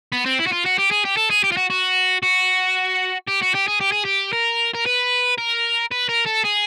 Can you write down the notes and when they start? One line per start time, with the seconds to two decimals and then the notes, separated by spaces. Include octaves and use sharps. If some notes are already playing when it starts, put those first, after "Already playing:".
0.12 B3
0.25 C4
0.39 E4
0.46 F#4
0.52 F4
0.65 F#4
0.78 G4
0.91 G#4
1.05 G4
1.17 A4
1.30 G#4
1.44 G4
1.52 F4
1.57 F#4
1.70 F#4
2.23 F#4
3.27 G4
3.42 F#4
3.54 G4
3.67 G#4
3.80 G4
3.92 G#4
4.05 G4
4.33 A#4
4.74 A#4
4.86 B4
5.38 A#4
5.92 B4
6.09 A#4
6.26 A4
6.44 G#4